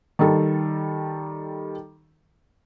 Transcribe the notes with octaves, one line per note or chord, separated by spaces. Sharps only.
D#3 G3 A4